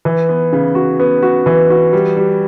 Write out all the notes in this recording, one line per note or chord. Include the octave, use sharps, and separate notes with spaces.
E3
B3
C#3
F#4
B3
F#4
E3
F#4
G3
G3